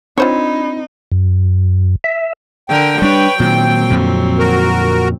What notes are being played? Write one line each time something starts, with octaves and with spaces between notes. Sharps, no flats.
C4 D4 D#4 F4 C5 C#5 B5
F#2
E5
D3 A#4 G5
G3 D4 B4 C#5
A#2 D#3 F#3 C4
F2 A#2 D3
F#4 A#4